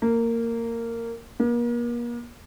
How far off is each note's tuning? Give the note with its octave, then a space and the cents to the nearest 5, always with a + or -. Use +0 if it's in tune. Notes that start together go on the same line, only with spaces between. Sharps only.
A#3 -15
A#3 +40